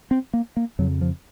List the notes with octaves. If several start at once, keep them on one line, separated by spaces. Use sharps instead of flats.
C4
A#3
A#3
F2 C#3 F#3
F3